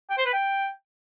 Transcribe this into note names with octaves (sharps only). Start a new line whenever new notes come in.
G5
C5
B4
G5